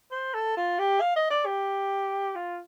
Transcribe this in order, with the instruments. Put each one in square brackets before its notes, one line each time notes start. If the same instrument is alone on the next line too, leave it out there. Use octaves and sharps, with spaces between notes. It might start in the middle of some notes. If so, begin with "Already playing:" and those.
[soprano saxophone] C5
A4
F4
G4
F5
D#5
D5
G4
F4